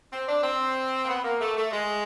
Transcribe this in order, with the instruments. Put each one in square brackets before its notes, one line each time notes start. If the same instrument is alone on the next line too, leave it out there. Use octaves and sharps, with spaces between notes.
[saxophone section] C4
D4
C4
A#3
B3
A#3
A3
A3
G#3